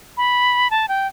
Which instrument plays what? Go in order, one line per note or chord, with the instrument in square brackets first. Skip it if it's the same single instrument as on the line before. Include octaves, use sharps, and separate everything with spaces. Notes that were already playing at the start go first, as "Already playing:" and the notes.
[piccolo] B5
A5
G5